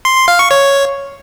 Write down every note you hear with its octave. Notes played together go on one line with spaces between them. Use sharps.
C6
C6
F5
C#6
C#5